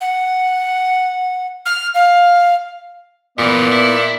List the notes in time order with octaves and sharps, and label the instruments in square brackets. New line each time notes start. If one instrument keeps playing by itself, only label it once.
[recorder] F#5
F6
F5
[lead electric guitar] F#2 E3 [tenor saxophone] A#2 [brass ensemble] B3 [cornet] D5
[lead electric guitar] E4